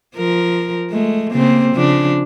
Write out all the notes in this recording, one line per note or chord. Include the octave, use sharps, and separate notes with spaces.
F3 A#4
G#3 A3
C#3 A#3 C4
C#3 F3 D4